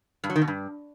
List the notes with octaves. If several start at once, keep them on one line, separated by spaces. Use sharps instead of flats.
G2
F#3
D#3
B2
G2